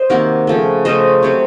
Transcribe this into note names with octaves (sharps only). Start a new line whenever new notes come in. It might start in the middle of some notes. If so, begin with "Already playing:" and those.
Already playing: C5 D#5
C3 D#3 A#3 F#4 A#4
C#3 F3 A3
C#3 A3 C#4 C5 D#5
C3 F#3 C4